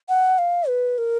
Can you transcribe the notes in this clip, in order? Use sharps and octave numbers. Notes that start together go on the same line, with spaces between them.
F#5
F5
B4
A#4